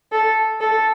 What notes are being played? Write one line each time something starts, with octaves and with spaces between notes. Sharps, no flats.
A4
A4